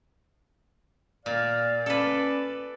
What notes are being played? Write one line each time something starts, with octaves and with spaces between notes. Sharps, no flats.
A#2 D5 F5
C#4 A4 B4 D5